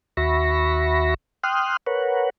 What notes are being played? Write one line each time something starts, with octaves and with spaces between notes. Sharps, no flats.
D#2 F#4 E5 B5 C#6 A#6
G5 C6 D#6 F6 F#6
A#4 B4 C#5 F#5